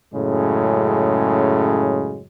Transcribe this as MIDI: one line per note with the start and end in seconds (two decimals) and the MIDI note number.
0.13 2.24 42
0.13 2.24 45
0.13 2.24 49
0.13 2.24 56